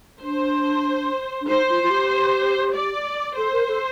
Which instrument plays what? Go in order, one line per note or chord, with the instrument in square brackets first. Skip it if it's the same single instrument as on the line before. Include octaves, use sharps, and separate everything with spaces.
[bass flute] D4 [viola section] C5
[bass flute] D4
[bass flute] D#4 [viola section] C5
[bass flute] F4
F4
G4
[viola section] D5
[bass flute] A4 [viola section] C5
[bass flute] A#4
A4